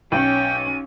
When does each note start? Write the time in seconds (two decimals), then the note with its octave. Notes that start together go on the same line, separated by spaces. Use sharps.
0.12 B1 C#4 G5 D#7